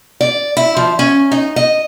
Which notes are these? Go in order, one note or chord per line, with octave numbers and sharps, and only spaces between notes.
D5
E4
F3
C#4
D#4
D#5